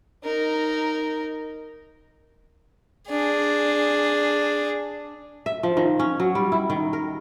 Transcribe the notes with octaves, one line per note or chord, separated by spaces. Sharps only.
D#4 A#4
D4 G#4
E5
F3
D#3
C#4
F#3
G3
E4
D#3
A#4